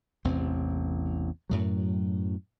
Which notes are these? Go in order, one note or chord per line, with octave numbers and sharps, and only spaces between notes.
A1 E2 C3 C4
F#2 A2 F#3